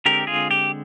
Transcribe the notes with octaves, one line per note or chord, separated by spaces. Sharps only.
D3 G#3 C4 G4 A#4
F4 G#4
G4